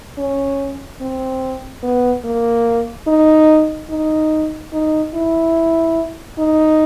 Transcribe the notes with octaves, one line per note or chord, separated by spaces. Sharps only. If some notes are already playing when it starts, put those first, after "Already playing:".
C#4
C4
B3
A#3
D#4
D#4
D#4
E4
D#4